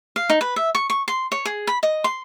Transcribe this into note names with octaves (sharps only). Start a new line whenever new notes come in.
F5
D#4
B4
E5
C#6
C#6
C6
C#5
G#4
B5
D#5
C6